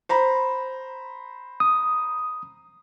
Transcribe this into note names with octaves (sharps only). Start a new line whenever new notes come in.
C5 A#5 B5
D#6